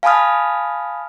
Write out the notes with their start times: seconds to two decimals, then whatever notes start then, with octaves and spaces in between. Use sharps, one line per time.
0.03 F5 G#5 A5 B5 D#6 F6